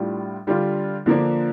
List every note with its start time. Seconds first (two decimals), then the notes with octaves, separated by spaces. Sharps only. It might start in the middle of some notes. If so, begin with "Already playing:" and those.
Already playing: A2 G3 D4 F4
0.47 D3 G3 D4 F4
1.06 D3 F3 A#3 D4